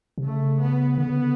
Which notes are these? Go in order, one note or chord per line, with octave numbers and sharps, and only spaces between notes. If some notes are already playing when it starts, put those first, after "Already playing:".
C3
C#3 A3
B3
D3 B3
C#3
D3